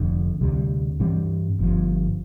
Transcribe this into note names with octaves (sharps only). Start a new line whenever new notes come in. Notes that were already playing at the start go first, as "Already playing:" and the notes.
Already playing: F1 F2 D3
D2 C3 G3
G2 E3 G3 C4
G1 G2 D3 F3